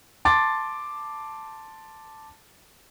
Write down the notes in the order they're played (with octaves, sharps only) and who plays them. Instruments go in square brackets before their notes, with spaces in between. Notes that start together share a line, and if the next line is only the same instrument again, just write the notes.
[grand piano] A5 C6 D6 A6